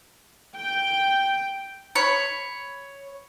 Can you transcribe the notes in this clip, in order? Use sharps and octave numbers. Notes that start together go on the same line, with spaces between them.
G5
C#5 B5